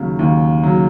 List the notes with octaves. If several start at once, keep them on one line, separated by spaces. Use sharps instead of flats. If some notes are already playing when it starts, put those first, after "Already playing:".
Already playing: D#2 C#3 F#3
D#2
C#3 F#3